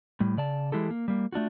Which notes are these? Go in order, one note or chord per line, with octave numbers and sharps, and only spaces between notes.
A2 G3
C#3 D5 A5
E3 G#3 E4 G4 A4
A#3
G3 A#3
A3 D4 F4 F#4